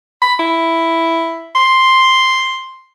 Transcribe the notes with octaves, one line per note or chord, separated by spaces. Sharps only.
B5
E4
C6